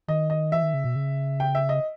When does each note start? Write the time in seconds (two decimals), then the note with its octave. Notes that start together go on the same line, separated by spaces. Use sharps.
0.08 D#3 D#5
0.30 D#5
0.52 E3 E5
0.63 D#3
0.74 C#3
0.84 B2
0.96 C#3
1.40 G5
1.55 E5
1.69 D#5